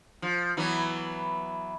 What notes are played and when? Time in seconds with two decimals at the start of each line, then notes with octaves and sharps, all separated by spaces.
0.22 F3
0.57 E3 F#3 B3